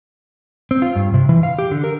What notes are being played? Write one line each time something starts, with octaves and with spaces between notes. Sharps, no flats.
C4
F4
G2
C3
E3
F5
G4
D3
A#4